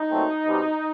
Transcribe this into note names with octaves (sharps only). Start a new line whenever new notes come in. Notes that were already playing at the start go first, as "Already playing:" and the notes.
Already playing: D#4
A#2 F#3 A3 C4
B2 G3 C4